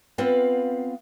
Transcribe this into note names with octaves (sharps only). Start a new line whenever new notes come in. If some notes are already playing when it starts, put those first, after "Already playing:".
B3 C4 F4 B4 F5 F#5